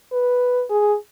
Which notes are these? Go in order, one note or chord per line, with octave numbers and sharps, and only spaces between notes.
B4
G#4